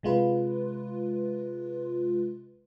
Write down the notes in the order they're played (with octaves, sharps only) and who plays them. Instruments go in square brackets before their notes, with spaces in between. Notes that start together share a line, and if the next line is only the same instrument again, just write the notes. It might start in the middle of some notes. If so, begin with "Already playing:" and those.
[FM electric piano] C3 G#3 F4 B4